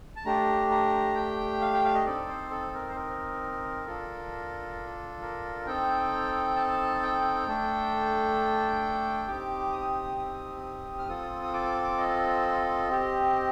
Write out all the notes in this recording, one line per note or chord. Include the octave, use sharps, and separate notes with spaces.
A5
A3 D4 G4 A#5
A#5
G5
F5
G5
F5
D#5
C4 D#4 A4 D5
C5
A4
A#4
C5
A#4
D4 F4 A4
A#4
C4 D#4 A4 G5
A5
G5
A3 D4 A4
C4 D#4 G4 D6
D#6
D#6
F6
C4 F4 A4 D#6
D#6
D6
D#5
C4 G4